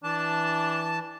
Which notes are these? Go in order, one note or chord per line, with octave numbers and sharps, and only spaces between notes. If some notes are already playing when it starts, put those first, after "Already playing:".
E3 D4 A5